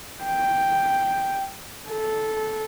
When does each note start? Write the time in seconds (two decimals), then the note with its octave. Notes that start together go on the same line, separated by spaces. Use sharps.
0.23 G5
1.89 A4